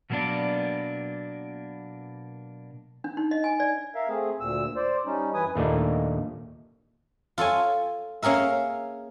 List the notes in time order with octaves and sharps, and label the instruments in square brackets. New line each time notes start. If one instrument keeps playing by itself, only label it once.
[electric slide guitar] B2 F#3 A#3 B3 D4 D5
[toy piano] D4
D#4
D#5
G#5
D5
[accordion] A#4 E5 F5
A3 C4 G#4
D2 A#2 E6
C5 D5
G3 C#4 D#4
F#2 E3 B4 G#5 D#6
[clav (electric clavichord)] D#2 A#2 A3 A#3 D4 D#4
[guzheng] F4 A4 C#5 G#5
A#3 C#4 G#4 A#4 E5